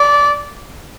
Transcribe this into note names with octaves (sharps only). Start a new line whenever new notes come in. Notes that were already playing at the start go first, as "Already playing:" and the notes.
Already playing: D5